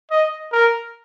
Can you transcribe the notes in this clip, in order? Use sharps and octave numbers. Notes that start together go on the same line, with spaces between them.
D#5
A#4